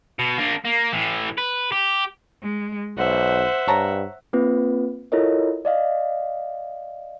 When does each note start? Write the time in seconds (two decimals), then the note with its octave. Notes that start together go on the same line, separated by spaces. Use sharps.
0.19 B2
0.38 A#3 D4
0.65 A#3
0.93 A2 E3
1.38 B4
1.72 G4
2.43 G#3
2.98 B1 C5 E5 F#5
3.68 G2 C#5 A5 A#5
4.33 A#3 C4 F4 B4
5.12 E4 F4 A4 A#4 C#5 D#5
5.65 D5 D#5 F5